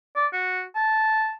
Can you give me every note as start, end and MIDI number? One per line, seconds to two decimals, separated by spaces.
0.16 0.26 74
0.33 0.62 66
0.76 1.31 81